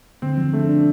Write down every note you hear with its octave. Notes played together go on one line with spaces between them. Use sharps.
D3 C4
F3
A3 D4
D4